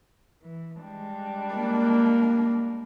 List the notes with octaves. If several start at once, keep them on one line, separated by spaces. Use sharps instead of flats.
E3
G3 G#3 D4
A#3